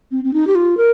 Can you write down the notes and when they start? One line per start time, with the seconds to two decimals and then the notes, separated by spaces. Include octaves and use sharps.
0.11 C4
0.24 C4
0.34 D#4
0.47 G4
0.55 F4
0.77 A#4